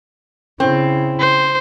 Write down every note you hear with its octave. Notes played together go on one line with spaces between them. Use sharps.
C#3 C4 E4
C5